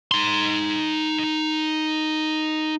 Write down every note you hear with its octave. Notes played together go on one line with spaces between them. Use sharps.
D#4 C6